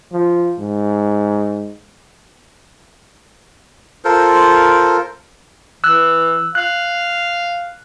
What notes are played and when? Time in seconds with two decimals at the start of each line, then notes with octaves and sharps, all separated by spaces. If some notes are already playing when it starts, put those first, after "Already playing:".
0.12 F3
0.59 G#2
4.05 F4 A4 A#4 C5
5.84 E3 E6 F#6
6.55 F5 F#6